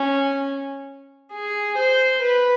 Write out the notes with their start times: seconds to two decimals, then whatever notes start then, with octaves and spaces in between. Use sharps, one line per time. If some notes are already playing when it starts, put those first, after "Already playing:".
Already playing: C#4
1.33 G#4
1.77 C5
2.22 B4